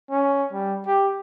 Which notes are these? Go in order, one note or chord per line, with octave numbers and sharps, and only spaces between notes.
C#4
G3
G4